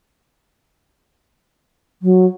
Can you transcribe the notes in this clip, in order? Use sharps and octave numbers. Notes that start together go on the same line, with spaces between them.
F#3